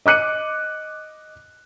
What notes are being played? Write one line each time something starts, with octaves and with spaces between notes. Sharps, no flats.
D#5 D6 F#6 C#7 D#7